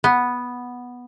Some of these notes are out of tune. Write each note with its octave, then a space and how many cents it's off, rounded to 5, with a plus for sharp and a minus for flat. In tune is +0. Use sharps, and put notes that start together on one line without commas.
B3 -5